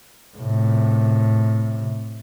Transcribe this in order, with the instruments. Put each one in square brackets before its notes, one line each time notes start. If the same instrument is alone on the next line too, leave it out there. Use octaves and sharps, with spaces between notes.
[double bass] A2 C3